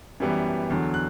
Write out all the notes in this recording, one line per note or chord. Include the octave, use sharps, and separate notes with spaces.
F#2 E3 G3 B3
E2 D3 F#3
F#6